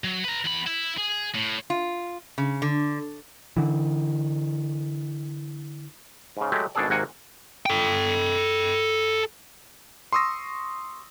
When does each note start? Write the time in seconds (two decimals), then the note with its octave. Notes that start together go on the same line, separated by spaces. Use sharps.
0.04 F#3
0.24 B4 A#5
0.45 E2 B5
0.67 E4
0.98 G#4
1.35 A2
1.70 F4
2.38 C#3
2.62 D3
3.57 D3 E3
6.37 G#2 C#3
6.52 F#3 G#3 A3 G4
6.75 G#1 B2 D4 G#4 A4 D5
6.90 G#1 C3 A#3 F#4 F#5 G#5
7.66 A4 G5
10.13 C6 C#6 D#6 E6 A#6